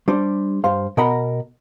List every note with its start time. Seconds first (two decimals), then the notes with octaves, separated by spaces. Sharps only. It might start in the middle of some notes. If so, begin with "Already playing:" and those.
0.08 G3 D4 C5
0.64 G2 C5 F5
0.97 B2 A#4 D#5 F#5 A#5 B5